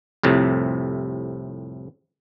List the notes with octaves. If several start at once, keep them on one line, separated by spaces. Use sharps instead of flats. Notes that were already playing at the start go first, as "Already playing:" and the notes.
C2 F2 A2 C3